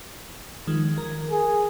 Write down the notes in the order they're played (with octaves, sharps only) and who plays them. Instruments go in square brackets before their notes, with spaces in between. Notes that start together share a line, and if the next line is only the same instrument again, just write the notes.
[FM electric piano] D#3 F3 G#3
A#4 G#6
[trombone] G#4